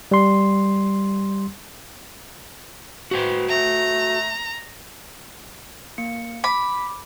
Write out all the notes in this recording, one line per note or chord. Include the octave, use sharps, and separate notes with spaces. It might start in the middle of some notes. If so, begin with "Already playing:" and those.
G3 C6
F#4 B4 C5 G5
A3 A#5
A#3 C#7
B5 D6